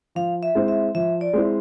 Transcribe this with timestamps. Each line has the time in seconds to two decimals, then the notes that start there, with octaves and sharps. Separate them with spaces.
0.15 F3 F5
0.43 E5
0.55 G#3 C4 E4
0.68 E5
0.95 F3 E5
1.21 D5
1.33 G#3 C4 E4